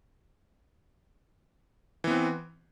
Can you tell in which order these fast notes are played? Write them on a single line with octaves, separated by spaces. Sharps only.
E3 B3 C4